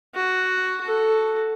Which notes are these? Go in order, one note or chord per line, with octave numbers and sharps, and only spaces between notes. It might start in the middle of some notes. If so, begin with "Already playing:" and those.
F#4
F#4 A4